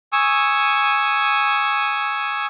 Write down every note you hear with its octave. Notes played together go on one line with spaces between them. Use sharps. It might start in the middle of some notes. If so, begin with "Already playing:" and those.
G#5 C#6 D#6 E6